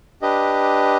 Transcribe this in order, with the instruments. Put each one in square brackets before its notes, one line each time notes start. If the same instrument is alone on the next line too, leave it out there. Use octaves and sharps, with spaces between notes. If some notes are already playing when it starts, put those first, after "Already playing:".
[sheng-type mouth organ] D4 G4 B4 D#5